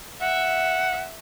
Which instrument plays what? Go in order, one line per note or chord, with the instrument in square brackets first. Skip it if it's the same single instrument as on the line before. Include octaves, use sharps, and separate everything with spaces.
[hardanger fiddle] E5 [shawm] F#5